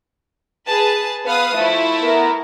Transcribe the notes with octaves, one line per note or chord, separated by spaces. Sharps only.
G#4 B4 A5
B3 B4 F5 D#6
F3 A3 E4
B3 A#4